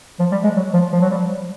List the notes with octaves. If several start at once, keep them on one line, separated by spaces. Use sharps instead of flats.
F3
G3
G#3
F#3
F3
F3
F#3
G3